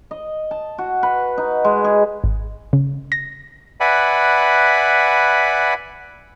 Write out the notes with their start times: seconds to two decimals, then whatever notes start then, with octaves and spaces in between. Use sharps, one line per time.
0.11 D#5
0.51 A5
0.78 F#4
1.03 B4
1.38 D#4
1.64 G#3
1.84 G#4
2.24 G#1
2.73 C#3
3.12 A#6
3.80 B4 D5 E5 F#5 G#5 B5